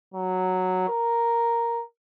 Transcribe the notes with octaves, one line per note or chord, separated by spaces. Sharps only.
F#3
A#4